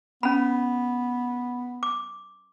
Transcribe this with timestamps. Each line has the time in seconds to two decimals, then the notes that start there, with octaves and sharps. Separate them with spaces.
0.23 B3 C#4 B5
1.83 D6